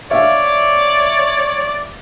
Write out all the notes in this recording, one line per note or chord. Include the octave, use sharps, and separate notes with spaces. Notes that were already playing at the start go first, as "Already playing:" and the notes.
C#5 D5 E5 F5